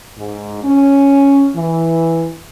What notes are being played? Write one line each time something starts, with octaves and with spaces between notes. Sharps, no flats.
G#2
C#4
E3